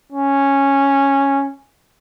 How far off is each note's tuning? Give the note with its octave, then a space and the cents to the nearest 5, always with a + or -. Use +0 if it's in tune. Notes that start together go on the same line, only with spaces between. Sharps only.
C#4 -5